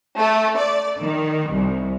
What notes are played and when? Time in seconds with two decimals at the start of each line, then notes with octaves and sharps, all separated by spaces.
0.19 A3
0.59 D5
1.01 D#3
1.50 C2